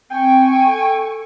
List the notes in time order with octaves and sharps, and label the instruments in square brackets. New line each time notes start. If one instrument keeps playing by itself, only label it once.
[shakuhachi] C4 [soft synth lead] G5 [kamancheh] G#5 C#6
[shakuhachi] A4